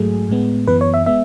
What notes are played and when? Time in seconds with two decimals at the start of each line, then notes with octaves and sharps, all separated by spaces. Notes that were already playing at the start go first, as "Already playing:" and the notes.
Already playing: G#2 F#3 A3 G#4
0.29 A2 G#3 B3
0.67 F#2 E3 B3 B4
0.81 C#5
0.94 E5
1.06 G#3 B3 E5